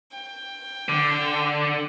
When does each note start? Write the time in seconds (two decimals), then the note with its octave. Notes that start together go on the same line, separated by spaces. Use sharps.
0.12 G5
0.89 D3 D6